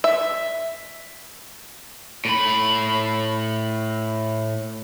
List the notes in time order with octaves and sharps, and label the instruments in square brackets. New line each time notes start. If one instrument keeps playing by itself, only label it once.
[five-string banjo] E5
[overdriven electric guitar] A2 B5